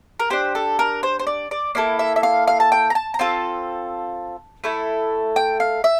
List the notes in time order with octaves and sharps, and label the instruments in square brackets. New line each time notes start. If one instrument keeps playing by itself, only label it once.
[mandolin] A#4
D4 G4 C5
A4
A#4
C5
C5
D5
D5
A#3 E4 A4 D5
E5
E5
F5
F5
A5
G5
A#5
A5
A#5
C4 F4 A4 A5
A3 E4 A4
G5
F5
E5